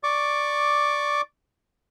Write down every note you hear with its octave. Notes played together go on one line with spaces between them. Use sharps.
D5 C#6 D6